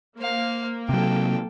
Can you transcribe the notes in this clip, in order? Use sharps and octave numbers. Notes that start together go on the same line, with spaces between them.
A#3 C5 F5
C3 F#3 A4 G5